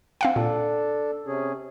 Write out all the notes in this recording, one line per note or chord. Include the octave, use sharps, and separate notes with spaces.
C4 F5 F#5
A#2 D4 A4
C3 C#4 G#4